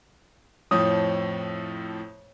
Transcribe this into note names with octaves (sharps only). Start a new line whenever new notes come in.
F2 A2 F3 C#5 D#6 G6 C7